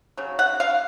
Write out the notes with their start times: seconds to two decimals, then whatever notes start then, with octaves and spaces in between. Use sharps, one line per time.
0.17 C#3 F#3
0.39 F#5
0.60 F5